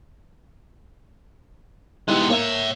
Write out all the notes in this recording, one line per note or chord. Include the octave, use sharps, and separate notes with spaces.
G#3 B3 D#4 E4 G4
A#3 C#5 E5